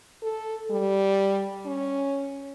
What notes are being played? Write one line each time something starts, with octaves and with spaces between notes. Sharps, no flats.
A4
G3
C#4